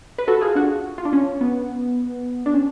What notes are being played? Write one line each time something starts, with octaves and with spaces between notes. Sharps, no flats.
B4
F#4 A4
F4 G#4
D4 F#4
F4
D4
C#4
B3
D4
C#4